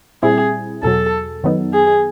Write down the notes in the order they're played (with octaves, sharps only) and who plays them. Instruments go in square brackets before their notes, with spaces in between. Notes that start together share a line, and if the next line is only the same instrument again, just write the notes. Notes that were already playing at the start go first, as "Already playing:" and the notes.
[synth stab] A#2 G3 C4 E4 [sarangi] G#4
[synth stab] E2 B2 F#3 [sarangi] A4
[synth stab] F#2 D#3 F#3 B3 D#4
[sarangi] G#4